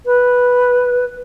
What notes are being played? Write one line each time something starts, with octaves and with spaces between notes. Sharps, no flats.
B4